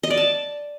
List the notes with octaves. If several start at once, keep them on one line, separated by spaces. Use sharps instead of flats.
D#5
D5
A5